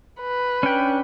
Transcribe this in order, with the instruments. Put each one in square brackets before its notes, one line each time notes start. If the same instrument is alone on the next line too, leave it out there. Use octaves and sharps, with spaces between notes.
[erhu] B4
[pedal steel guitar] C#4 D4 G5